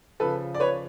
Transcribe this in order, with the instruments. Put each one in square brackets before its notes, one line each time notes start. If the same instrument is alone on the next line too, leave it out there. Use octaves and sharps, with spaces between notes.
[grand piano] C#3 F3 A4 B4
D5
B4 C#5